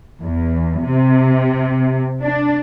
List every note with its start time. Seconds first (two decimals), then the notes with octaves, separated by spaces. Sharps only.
0.21 E2
0.83 C3
2.22 D4